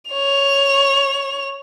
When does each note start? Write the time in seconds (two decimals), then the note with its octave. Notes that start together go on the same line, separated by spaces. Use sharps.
0.11 C#5 F7